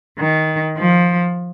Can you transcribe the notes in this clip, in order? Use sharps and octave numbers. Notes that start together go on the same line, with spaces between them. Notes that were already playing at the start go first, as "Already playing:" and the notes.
D#3
F3